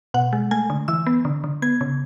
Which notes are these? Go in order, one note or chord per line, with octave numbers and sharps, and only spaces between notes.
B2 F#5
G#3
A3 G#5
D3
E3 E6
B3
D3
D3
B3 G#6
C#3